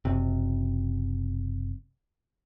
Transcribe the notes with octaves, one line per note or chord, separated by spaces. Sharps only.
F#1 C3